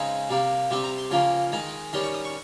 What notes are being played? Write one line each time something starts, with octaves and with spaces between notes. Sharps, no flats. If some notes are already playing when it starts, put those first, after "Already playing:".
Already playing: C#3 G#3 C4 D#4
C3 G3 A#3
C3 G3 C4 C6
A#5
C6
C#3 F3 A#3 C#4 C6
D#3 G#3 D#4
D#3 G3 C#4 C6
C#6
D#6
C#6